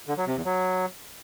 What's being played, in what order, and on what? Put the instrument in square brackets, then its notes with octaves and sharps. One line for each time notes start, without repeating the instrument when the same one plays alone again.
[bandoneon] D3
F#3
C3
E2
F#3